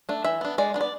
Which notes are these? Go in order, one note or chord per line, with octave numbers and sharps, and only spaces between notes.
A3 D4
E3 E5
B3 D4
G#3 D5
B3 D4
D5